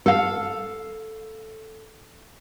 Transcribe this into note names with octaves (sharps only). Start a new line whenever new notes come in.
A4 F5